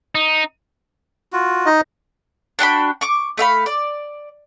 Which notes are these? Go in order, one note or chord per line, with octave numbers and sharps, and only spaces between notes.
D#4
F4 F#4
D#4 D#5
D4 F#4 G5 B5
C#6 D6
A3 E5 F5 B5
D5